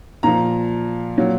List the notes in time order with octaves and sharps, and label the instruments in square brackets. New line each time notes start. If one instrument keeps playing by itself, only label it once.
[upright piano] A#2 F3 A#5
A#2 F#3